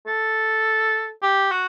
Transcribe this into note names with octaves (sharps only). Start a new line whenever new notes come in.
A4
G4
F#4